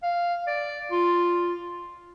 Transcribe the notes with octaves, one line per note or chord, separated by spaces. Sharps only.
F5
D5
F4